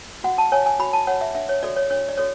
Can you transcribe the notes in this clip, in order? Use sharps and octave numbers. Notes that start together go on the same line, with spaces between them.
F#4 F#5
A5
C#5 G#5
G#5
F#4 B5
A5
C#5 F#5
E5
D4 E5
C#5
F#4 A4 C#5 D5
C#5
D4 C#5
D5
F#4 A4 C#5